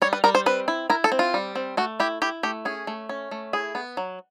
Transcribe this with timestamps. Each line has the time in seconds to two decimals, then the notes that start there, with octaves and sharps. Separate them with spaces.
0.02 G3 C#5
0.13 B4
0.24 G3 A#4
0.35 C5
0.46 C4 B4
0.68 E4
0.90 E4 A#4
1.04 A4
1.12 C4
1.19 F4
1.34 G3
1.55 C4
1.77 A3 F#4
2.00 E4 G4
2.22 E4 G4
2.43 A3 G4
2.65 C#4 G#4
2.87 A3
3.09 C#4
3.31 A3
3.53 E4 G#4
3.75 B3
3.97 F#3